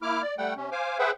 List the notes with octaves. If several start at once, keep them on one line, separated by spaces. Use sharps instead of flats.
A#3 E4 D6 F6
D5
G3 A3 F#5 G5
C3 C#4
C5 F5 G#5 D6
G#4 B4 C5 E5 F#5 G5